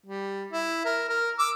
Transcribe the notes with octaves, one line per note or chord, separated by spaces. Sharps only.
G3
E4
A#4
A#4
D6 E6